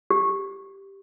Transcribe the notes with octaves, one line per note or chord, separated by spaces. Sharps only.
G4